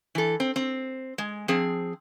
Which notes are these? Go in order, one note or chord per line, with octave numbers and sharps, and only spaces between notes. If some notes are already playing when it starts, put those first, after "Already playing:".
E3 A4
C4
C4
G#3
F3 C4 G#4